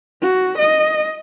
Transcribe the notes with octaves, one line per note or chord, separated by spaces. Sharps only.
F#4
D#5